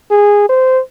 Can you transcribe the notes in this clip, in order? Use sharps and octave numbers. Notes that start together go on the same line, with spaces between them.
G#4
C5